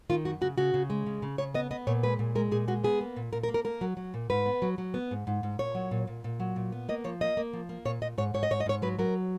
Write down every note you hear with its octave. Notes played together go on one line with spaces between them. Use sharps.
D#3 F4
F#2 F#4
C#3 F#4
C#3 F#4
C#3
G#3
C#3
C#3
C#3 C#5
B3 D#5
B3 D#5
A#2 C#5
G#3 B4
A#2
G#3 A#4
A#2 G#4
G#3 F#4
B3 G#4
A#3
A#2
A#2 A#4
A#4
A#3
A#4
A#3 A#4
F#3
F#3
A#2
G#2 B4
B3
F#3
F#3
B3
G#2
G#2
G#2
A#2 C#5
F#3
A#2
A#2
A#2
F#3
A#2
B3
A#3 D#5
F3 C#5
A#3 D#5
A#3
F3
A#3
A#2 C#5
A#2 D#5
G#2 C#5
G#2 C#5
D#5
G#2 C#5
D#5
G#2 C#5
F#3 B4
F#3 A#4